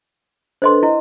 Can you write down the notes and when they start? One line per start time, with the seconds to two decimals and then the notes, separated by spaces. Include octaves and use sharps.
0.62 D4 A4 B4 C5 D#5 C6
0.83 E4 D#5